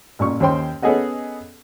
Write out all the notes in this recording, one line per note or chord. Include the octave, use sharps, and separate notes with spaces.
A1 A#2 C#6
D#2 C#4 C5 G5 C6
B3 C#4 G#4 A4 D#5 F#5